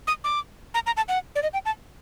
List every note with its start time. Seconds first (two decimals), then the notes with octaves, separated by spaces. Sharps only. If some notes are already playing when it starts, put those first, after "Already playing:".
0.07 D#6
0.24 D6
0.74 A#5
0.86 A#5
0.97 A5
1.08 F#5
1.36 D5
1.43 D#5
1.53 G5
1.65 A5